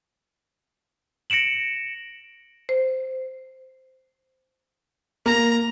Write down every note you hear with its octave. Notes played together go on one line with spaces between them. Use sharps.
A#6 C#7 D7 E7 F#7
C5
A#3 A#5